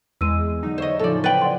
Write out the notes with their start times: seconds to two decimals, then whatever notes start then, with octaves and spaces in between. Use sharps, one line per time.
0.21 E2 G#3 E6 D#7
0.63 D3 F#3 D#4
0.78 A4 C5 C#5 D#5 E5
0.99 A2 C#3 F3 A4 D5
1.24 B4 G5 A6 F#7
1.42 D5 F#5 C6